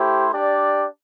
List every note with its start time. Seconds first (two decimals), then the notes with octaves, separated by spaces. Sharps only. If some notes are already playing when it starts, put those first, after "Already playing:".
Already playing: A3 E4 G4 C5
0.32 D4 G4 D5